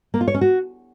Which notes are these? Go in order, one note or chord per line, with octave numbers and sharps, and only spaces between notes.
A#3
F4
C#5
C#4
F#4